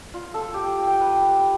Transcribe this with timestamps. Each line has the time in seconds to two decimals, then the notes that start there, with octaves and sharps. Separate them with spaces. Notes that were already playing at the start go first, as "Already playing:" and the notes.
0.14 F4
0.34 A4
0.54 G4
0.87 G5
1.01 B4
1.29 G4